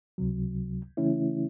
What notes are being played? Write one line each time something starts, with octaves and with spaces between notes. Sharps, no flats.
C#2 C3 F#3
C#3 E3 A3 C#4 E4